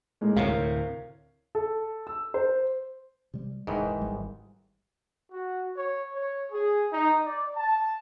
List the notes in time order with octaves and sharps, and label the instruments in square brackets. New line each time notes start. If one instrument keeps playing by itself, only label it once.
[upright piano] A2 G#3 A#3
[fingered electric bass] D2 A2 C3 [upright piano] A#4 C#5 F5
[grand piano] A4
E6
C5
[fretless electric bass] C3 G3
[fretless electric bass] D#1 [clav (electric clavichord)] G#2 D#3 E3
[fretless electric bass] G#1 G3
[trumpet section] F#4
C#5
C#5
G#4
D#4
D5
A5